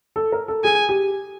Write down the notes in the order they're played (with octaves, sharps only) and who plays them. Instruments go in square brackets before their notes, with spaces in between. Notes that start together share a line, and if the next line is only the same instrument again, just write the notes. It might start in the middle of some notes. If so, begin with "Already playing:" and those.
[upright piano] A4
A#4
A4
[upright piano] G#4 [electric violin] G#5
[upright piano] G4